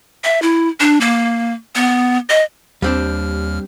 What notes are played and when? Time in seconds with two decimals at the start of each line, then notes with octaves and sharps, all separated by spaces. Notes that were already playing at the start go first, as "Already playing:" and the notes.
0.24 E5
0.42 E4
0.80 D4
1.01 A#3
1.75 B3
2.29 D#5
2.82 D#2 G3 C4 D4 F6